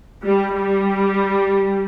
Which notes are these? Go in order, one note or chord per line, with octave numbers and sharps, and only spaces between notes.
G3
G3